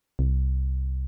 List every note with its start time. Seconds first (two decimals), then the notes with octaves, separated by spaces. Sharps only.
0.19 C2